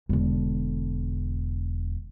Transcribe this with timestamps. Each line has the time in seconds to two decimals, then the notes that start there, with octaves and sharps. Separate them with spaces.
0.09 E1 D3